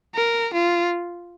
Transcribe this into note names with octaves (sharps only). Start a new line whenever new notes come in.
A#4
F4